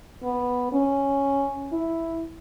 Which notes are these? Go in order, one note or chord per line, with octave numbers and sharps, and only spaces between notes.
B3
C#4
E4